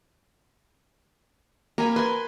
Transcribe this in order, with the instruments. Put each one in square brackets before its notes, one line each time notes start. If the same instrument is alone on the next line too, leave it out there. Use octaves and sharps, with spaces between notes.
[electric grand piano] A#3 [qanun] A#4 G#5 B5
[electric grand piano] B4 [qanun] G#5 C6